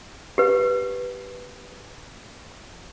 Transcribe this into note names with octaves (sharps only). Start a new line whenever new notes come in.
G4 B4